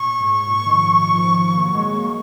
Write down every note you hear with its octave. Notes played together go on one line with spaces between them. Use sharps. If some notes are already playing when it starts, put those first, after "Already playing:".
Already playing: A#2 C#6
G#2
A#2
D#3
F3
F3
D#3
F3
A#3
F#3
G#3
A#3